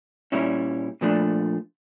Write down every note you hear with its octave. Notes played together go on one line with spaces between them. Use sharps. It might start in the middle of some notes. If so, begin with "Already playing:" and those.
A#2 G3 C#4 E4
A#2 F3 A3 D4